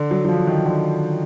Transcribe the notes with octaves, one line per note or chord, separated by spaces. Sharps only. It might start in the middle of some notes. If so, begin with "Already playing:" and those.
Already playing: D3
F#3
F#3
F3
D#3
D3